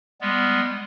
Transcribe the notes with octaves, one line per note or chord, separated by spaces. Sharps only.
G3 G#3 B3